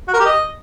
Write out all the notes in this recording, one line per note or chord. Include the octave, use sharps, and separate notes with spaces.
F#4
A#4
G4
D#5